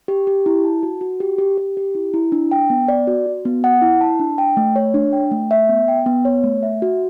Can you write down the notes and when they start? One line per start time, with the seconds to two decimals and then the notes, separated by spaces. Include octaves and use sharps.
0.08 G4
0.27 G4
0.46 E4
0.64 A5
0.83 F#4
1.01 F#4
1.20 G4
1.38 G4
1.58 G4
1.77 G4
1.95 E4
2.14 E4
2.32 D4
2.51 G5
2.70 B3
2.88 D5
3.07 F#4
3.26 F#4
3.45 B3
3.64 F#5
3.82 E4
4.01 A5
4.19 D4
4.38 G5
4.57 A3
4.76 C#5
4.94 D4
5.13 G5
5.31 A3
5.51 E5
5.69 B3
5.88 G5
6.06 B3
6.25 C#5
6.44 A3
6.63 E5
6.82 F#4